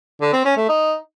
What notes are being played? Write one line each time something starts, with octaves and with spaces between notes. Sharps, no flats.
D3
C4
C#4
A3
D#4